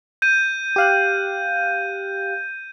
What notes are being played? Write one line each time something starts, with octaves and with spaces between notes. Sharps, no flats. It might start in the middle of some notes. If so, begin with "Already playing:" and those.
G6 D#7
G4 F5 F#6